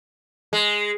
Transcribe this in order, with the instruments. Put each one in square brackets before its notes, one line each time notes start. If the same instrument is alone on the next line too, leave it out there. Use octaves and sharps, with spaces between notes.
[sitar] G#3